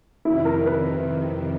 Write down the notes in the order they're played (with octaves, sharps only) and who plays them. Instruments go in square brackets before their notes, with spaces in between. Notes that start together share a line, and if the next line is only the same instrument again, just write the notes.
[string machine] F2 C3 D#3 [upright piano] E4
[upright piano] A#4
B4